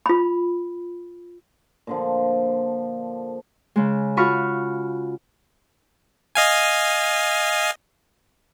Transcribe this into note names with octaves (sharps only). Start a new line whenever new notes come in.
F4 B5
A#2 D3 F3
C#3 G#3
F4 F#4 B5 C#6 F6
D#5 F5 G#5